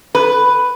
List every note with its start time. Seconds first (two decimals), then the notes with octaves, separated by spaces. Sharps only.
0.15 B4